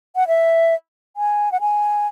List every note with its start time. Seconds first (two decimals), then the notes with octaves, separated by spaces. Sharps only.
0.16 F#5
0.28 E5
1.17 G#5
1.52 F#5
1.61 G#5